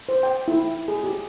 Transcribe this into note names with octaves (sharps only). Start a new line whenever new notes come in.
C5
G5
E4
G#4
G4